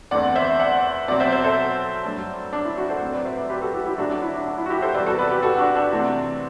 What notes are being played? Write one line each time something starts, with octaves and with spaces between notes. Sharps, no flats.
E2 D3 A3 C4 D5 F#5
C5 E5
D5 F#5
B2 F#3 C4 D5 F#5
C5 E5
C5 E5
A4 C5
G2 F#3 A3 D4
D4
E4
D4 F#4
A4 C5
A2 F#3 C4
B4 D5
C5 E5
B4 D5
G4 B4
F#4 A4
E4 G4
E4 G4
D2 D3 F#3 A3 D4 F#4
D4
E4
D4
D4
E4
F#4
E4 G4
A4 C5
E2 C3 G3 B3 B4 D5
F#4 A4
B4 D5
G4 B4
F#4 A4
D4 F#4
D4
C3 E3 A3 C4